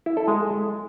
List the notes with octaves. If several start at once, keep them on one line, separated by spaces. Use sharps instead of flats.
E4
A4
G#3